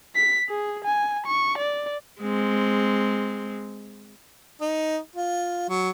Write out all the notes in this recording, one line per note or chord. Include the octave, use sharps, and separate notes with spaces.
B6
G#4
G#5
C#6
D5
G#3 C4
D#4
F4
F#3